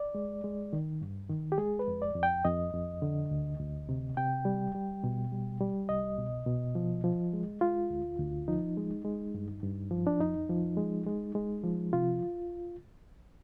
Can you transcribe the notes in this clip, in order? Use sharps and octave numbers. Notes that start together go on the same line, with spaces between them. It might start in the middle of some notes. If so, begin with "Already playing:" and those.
Already playing: D5
G#3
G#3
D#3
G2
D#3
G4
G#3 G#4
B4
F2
D5
F2
G5
F2 D#5
F2
D3
D2
D2
C3
C3 G5
G3
G3
B2
G3
G3
C2 D#5
B2
B2
F3
F3
G#3
G#3 F4
D2
D2
F3 D#4
G#3
G#3
G2
G2
F3
D4
F2 D#4
F3
G#3
G#3
G#3
F3
C3 F4